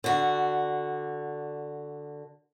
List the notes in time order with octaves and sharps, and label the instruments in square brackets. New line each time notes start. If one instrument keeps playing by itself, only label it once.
[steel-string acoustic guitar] D3 F#4